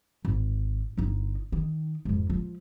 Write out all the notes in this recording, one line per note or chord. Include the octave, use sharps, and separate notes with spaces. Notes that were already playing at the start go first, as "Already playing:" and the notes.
G#1
G1 D#4
D#3
F2 G#2
F3